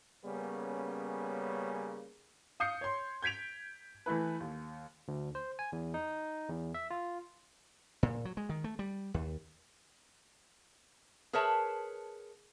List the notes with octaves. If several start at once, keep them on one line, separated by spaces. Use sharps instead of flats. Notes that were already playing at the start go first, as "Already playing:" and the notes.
C#3 G3 A#3 B3 C#4
F5 D#6 G6 C7 C#7
C#5 C6
G6 G#6 B6 D7 F7
E3 A3 E4 B4
D#2
D2
C5
G#5
E2
D#4
E2
E5
F4
A#2
F#3
G#3
D#3
A3
G3
D#2
G#4 A#4 B4 C#5 E5 A5